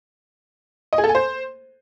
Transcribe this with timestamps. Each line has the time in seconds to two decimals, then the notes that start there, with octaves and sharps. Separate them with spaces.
0.93 D#5
0.98 G#4
1.04 A4
1.09 G#5
1.15 C5